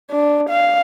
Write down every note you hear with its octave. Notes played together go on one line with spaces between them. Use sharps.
D4
F5